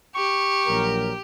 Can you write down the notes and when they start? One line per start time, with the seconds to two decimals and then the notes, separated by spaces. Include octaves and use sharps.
0.15 G4 C#6
0.67 A#1 F#3 A#4